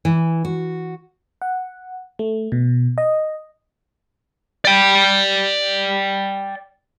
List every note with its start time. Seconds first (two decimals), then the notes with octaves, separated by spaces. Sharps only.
0.05 E3
0.45 F#4
1.42 F#5
2.19 A3
2.52 B2
2.98 D#5
4.65 D5 G5